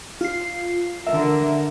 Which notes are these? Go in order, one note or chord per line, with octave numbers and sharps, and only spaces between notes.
F4 C7
D3 A#4 E5